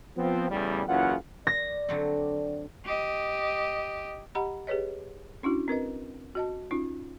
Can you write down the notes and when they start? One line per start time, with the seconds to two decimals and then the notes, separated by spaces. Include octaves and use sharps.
0.16 F3 B3 C4
0.50 A1 E2 C#3 G3
0.87 F#1 C#3 E3 F4 F#5
1.47 D5 A#6
1.89 D3 F#3 C4
2.85 G4 D#5
4.35 G4 D#5 F#5 A#5 B5
4.67 G4 G#4 B4 C#5 D#5
5.43 C#4 D4 E4 F#4
5.68 C4 A#4 B4 D#5
6.35 F#4 D#5 A5
6.71 C#4 D#4 F4